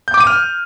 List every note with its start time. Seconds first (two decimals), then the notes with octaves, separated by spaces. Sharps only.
0.08 G6
0.14 D6
0.20 D#7
0.27 F6